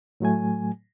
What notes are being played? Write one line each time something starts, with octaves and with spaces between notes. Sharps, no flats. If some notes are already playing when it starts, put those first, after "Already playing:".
A2 F#3 A3 G#5